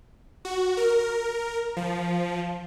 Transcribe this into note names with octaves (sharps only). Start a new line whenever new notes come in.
F#4
A#4
F3